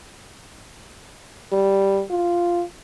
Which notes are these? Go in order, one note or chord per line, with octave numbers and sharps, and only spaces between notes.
G3
F4